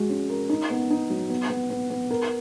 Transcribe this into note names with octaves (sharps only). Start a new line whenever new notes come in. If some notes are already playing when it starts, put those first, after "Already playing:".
Already playing: G#3 F#4
C#4
A#4
D#4
B3
D#4
F#3
B3
B3
B3
B3
A#4